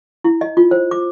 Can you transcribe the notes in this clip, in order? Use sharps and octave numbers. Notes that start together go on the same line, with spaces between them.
E4
D#5
F4
C5
D6